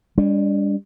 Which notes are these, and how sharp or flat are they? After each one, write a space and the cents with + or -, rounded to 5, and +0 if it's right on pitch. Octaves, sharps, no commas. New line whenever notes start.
G3 +40 D4 -30